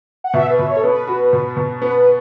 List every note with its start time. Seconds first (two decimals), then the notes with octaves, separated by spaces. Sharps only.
0.24 F#5
0.34 B2 E5
0.50 B4
0.59 B2 E5
0.67 C#5
0.76 A4
0.83 B3 B4
1.07 F#4
1.33 B2
1.57 B2
1.81 B3 B4
1.97 B4